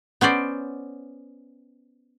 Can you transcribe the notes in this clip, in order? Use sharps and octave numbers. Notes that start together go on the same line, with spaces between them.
B3 C#4 C5 D5